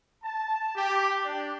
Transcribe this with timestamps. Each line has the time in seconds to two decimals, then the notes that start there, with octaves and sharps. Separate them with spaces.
0.23 A5
0.75 G4
1.23 D4